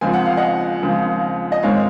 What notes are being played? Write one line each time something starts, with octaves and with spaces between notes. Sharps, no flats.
D#2 C#3 F3 G#3 C4 G#5
F#5
F5
D#5 F#5
D#2 C#3 F3 G#3 C4
D#5
G#2 D#3 G#3 C4 C#5 F5